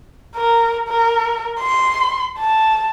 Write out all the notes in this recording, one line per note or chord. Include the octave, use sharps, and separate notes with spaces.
A#4
A#4
C6
A5